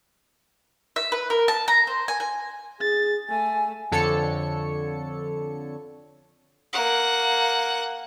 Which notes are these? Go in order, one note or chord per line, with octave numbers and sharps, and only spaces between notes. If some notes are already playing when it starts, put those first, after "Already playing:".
E5
B4
A#4
A5
A#5
C5
G#5
G#5
G#4 A6
A3 G#5
F2 D3 A4 C#5 C#7
A#3 F#5